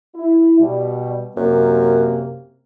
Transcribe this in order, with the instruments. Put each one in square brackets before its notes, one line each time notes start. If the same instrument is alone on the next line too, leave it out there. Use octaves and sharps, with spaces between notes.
[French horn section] E4
B2 G3
[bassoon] F#2 [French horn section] C3 A#3